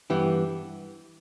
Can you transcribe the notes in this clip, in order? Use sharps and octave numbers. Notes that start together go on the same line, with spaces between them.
G2 E3 B3 E4 G4